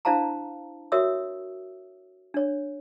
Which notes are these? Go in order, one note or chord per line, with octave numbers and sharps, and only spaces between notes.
D4 E4 C5 F5 A5 A#5
F#4 A#4 C#5 E5 D#6 E6
D4 C#5